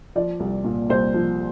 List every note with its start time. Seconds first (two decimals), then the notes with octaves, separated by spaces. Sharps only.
0.16 F3 D5
0.40 C2
0.64 A#2
0.89 C2 C5
1.14 F3